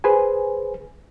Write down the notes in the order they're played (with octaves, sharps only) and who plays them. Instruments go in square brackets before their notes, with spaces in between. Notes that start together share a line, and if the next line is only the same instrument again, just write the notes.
[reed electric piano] G#4 B4 C5 G#5